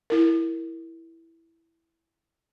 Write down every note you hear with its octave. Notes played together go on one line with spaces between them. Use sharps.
E4 A#4